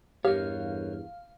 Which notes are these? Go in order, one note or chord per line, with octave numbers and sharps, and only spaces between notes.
E2 G2 G4 A#4 C#5 F5